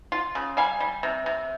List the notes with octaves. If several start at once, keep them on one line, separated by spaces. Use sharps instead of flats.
F4
C#3
G3 F5 G#5
G3
C3
C3